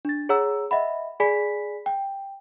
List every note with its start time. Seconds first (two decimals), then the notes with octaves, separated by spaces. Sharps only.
0.05 D4 A6
0.29 G#4 C#5 F#5 A#5 E6
0.71 D#5 E5 F#5 B5
1.20 G#4 D5 G#5 B5 B6
1.86 G5